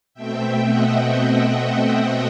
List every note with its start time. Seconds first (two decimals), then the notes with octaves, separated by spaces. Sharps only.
0.14 B2 A3 C4 E5 G5
0.64 D#5 F#5
1.14 D#5 F#5
1.64 D#5 F#5